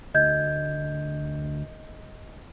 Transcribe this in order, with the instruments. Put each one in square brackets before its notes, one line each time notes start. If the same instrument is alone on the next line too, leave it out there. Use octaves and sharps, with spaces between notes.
[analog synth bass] D2 [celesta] D#5 G6 G#6